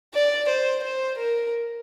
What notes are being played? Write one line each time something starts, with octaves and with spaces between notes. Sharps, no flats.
D5
C5
C5
A#4